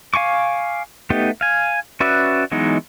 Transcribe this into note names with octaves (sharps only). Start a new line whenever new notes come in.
F5 G#5 C#6 D6
A3 B3 D#4 G4
F5 G#5
C#4 F#4 B4 D5 E5
E3 F#3 G#3 B3 D#4